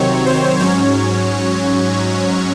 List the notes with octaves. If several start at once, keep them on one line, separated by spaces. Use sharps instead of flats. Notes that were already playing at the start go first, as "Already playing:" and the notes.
Already playing: C3 D#3 F#3 C4 C#5
C5
G#2 F#3 C#4 C#5